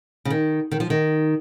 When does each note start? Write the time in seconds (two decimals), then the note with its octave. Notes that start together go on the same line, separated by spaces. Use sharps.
0.25 C#3
0.30 D#3
0.71 D#3
0.80 F3
0.90 D#3